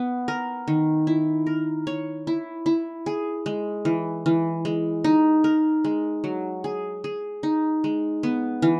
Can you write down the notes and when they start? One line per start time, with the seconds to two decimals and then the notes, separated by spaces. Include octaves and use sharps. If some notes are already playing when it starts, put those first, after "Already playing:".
Already playing: B3
0.28 A#4
0.68 D#3
1.07 E4
1.47 A#4
1.87 C#5
2.27 E4
2.66 E4
3.06 G#4
3.46 G#3
3.85 E3
4.26 E3
4.65 G#3
5.04 D#4
5.44 A#4
5.84 G#3
6.24 F#3
6.64 G#4
7.04 G#4
7.43 D#4
7.84 G#3
8.23 B3
8.62 E3